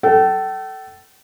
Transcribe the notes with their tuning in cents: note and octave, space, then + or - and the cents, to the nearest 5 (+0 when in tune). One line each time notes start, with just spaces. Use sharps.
A4 +0 G5 -40